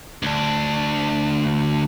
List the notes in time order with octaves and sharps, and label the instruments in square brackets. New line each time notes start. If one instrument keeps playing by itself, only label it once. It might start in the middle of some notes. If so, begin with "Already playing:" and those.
[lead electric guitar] D2 D4